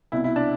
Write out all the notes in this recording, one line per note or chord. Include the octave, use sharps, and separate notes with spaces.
C2 B2 E4
E4
D4